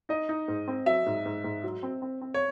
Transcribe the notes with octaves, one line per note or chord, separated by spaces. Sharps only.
D#4 D#5
D#4
G#2
C4
F#3 E5
G#2
G#2
G#2
F#3
C4
C4
C4
C#5